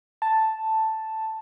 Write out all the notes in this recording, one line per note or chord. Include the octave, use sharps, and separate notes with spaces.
A5